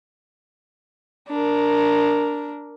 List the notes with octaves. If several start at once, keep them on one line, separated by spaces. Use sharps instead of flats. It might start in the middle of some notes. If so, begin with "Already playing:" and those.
D4 A#4